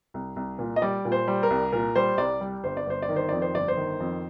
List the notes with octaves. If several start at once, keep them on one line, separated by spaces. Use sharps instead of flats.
C2
C2
A#2
D#5
G3 D5
A#2
C5
G3
A#4
C2
A#2 A#4
G3 C5
C2 D5
G3
G1 C5
D5
G1 C5
D5
D#3
C5
F2 D5
C5
G1 D5
C5
D#3
F2